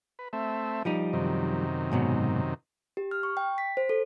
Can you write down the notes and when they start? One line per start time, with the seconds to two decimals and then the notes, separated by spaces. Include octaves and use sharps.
0.19 B4
0.33 A3 C4 E5
0.85 F3 G3 D#4
1.13 F#2 C3 D#3
1.91 G#2 B2 F#3
2.97 G4
3.11 F6
3.23 C#6
3.37 G5
3.58 B6
3.77 C5
3.89 A4